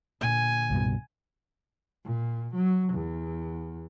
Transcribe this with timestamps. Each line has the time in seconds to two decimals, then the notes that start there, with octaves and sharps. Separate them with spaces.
0.21 A#2 D3 G#5
0.70 C2 G2 B2
2.05 A#2
2.55 F#3
2.94 E2